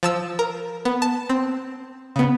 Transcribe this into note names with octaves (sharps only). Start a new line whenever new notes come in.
F3 A5 E6
A#4
B3
A5
C4
C#3 B3